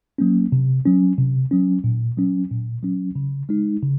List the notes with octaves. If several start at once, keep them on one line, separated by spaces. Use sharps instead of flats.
F#3 A#3 C#4
C3
F#3 C#4
C3
F#3 C#4
A#2
F#3 C#4
A#2
F#3 C#4
C#3
G#3 D#4
C#3